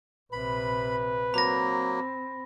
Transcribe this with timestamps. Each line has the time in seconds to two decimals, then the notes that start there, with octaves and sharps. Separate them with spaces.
0.32 A#1 C3 B4 B5
1.34 F#3 A#3 C4 B5 A#6